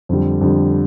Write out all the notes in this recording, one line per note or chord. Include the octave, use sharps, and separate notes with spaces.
F2 D3 G3
F2 D3 G3